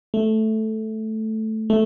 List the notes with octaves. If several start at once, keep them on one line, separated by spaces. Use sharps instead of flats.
A3
A3